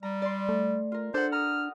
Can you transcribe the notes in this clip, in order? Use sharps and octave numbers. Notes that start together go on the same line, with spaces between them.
G3 A#5
D5 C6
A3
F4 A#4
D4 A4 C5 F#5
A#5 D#6 F6